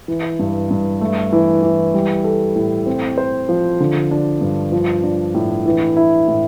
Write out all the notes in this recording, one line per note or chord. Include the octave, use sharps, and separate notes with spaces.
E3
G2
G2
A3
E3
E3
G3
A4
A2
C4
C5
F3
D3
D4
G2
F3
D4
A2
E3
E4
A2